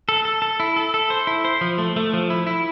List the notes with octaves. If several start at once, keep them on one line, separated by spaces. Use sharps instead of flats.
A4
A4
A4
E4
A4
A4
C5
E4
C5
F3
A3
A3
F3
E4
E4